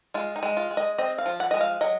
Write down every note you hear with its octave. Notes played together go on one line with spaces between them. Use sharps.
G#3 F4
D#4
G#3
F4
G#3
D#5
C4 D#5
F5
F3
F#5
G#3 D#5
F5
F#3 D#5